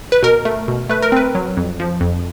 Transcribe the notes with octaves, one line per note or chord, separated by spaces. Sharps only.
B4
B2 A#4
A3
B2
A3 B4
A#4
C4 B4
F#3
F2
F3
F2